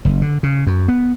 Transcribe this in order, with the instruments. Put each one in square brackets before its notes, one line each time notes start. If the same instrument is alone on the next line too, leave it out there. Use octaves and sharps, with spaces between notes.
[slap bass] F#1
D3
C#3
F#2
B3